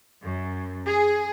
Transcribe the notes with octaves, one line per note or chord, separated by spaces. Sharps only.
F#2
G#4